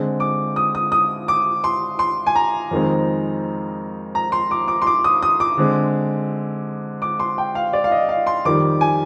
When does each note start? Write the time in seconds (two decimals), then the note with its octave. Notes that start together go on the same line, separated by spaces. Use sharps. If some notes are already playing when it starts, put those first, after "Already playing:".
Already playing: D3 G#3 C4
0.20 D6
0.56 D#6
0.75 D#6
0.92 D#6
1.28 D6
1.64 C6
1.99 C6
2.26 G#5
2.36 A#5
2.71 F2 D#3 G#3 C4
4.15 A#5
4.32 C6
4.51 D6
4.68 D6
4.82 C6
4.87 D6
5.04 D#6
5.22 D#6
5.40 D6
5.57 D3 G#3 C4
7.02 D6
7.20 C6
7.38 G5
7.55 F5
7.73 D5
7.84 F5
7.91 D#5
8.09 F5
8.27 C6
8.45 F2 D#3 G3 D6
8.81 G#5